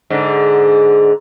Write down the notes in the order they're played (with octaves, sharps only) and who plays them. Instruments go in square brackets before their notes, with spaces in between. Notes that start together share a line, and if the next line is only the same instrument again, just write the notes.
[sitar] G#2 D3